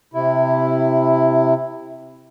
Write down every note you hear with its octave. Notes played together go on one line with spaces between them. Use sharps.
C3 E4